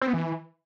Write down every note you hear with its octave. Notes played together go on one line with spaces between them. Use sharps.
C4
B3
E3